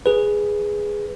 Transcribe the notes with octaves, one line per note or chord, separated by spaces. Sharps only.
G#4 B4